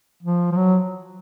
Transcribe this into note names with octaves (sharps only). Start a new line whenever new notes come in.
F3
F3
F#3